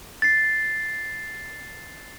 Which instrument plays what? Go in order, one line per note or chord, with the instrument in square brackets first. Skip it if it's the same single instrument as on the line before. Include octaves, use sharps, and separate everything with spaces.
[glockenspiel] A6 C7